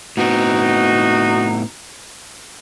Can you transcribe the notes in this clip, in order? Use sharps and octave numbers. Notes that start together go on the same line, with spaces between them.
A2 B3 C4 D#4 F#4